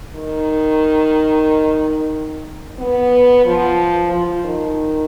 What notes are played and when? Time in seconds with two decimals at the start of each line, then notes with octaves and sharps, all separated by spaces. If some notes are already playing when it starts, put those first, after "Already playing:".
0.16 D#3
2.79 B3
3.45 F3
4.11 F3
4.45 D#3